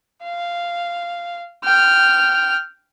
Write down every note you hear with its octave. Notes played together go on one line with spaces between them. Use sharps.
F5
G5 F6